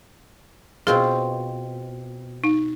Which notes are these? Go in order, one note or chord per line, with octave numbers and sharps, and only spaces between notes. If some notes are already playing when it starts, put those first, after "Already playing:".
B2 C4 F4 G#4
D#4